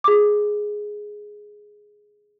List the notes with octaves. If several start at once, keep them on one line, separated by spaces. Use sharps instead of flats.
G#4 D6